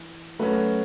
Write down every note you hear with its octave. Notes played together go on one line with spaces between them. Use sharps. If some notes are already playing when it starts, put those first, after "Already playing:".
Already playing: E3
F#3 A3 C#4 F#4 B4